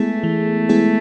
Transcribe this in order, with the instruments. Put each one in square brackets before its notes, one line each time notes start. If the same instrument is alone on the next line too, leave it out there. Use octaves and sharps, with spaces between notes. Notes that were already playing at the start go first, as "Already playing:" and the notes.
Already playing: [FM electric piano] G#3 B3 E4 G#4 [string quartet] A3
[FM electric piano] E3
G#3 B3 E4 G#4